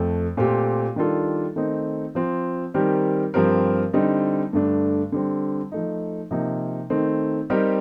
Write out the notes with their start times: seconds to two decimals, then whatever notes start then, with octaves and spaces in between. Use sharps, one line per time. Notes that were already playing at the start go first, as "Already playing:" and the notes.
Already playing: F2 A3
0.37 A#2 A3 C4 G4
0.96 D#3 G3 D4 F4 A4
1.56 D#3 A3 C4 D#4
2.15 F3 C4 F4
2.74 D#3 G3 C4 G4 A#4
3.34 G2 F3 C4 G4 A#4
3.93 D3 G3 C4 D#4
4.53 G2 D3 A3 D4
5.12 D3 G3 C4
5.72 F3 A3 D#4
6.31 C3 F3 A#3 D#4
6.90 D#3 A3 C4 D#4
7.50 G3 C4 D#4 G4 A#4